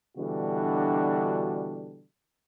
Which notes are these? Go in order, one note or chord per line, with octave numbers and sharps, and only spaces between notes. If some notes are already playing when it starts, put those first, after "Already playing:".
B2 D3 E3 G3 D4 F#4